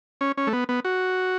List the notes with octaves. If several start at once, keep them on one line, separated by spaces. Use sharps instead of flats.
C#4
C#4
A3
B3
B3
F#4